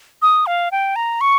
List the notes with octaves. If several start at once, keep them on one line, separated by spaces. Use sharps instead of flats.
D#6
F5
G5
A#5
C#6